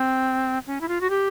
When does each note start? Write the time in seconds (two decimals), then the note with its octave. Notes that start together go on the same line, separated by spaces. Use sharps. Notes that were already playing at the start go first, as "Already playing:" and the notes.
Already playing: C4
0.67 C#4
0.81 E4
0.88 F4
1.01 F#4
1.10 G4